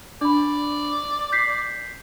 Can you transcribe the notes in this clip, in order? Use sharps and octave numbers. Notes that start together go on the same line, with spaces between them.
D4 D5 B5
G6 B6 C7